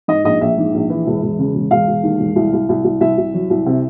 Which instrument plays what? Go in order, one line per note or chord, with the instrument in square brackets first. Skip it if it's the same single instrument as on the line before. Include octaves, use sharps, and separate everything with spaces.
[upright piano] G#2 D#5
A#1 D#5
A#1 E5
G#2
A#1
E3
E1
E1
C#3
E1
E1 F5
E1
D#2
E1
C2
C2
C2
C2
C2 E5
C2
F#3
C2
C3